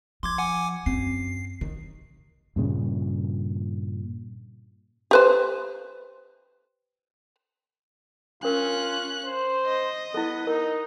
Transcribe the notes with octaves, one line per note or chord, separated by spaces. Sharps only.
F3 C6 D6 G#6
F#5 G#5 D6
F#2 C4 C7
D#3
G2 A#2 C#3
G4 B4 C5
C#4 D4 F4 A#4 F#6
C5
D#5
B3 E4 A4
D#4 A#4